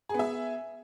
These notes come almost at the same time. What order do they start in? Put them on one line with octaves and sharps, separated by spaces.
G#4 B3 E5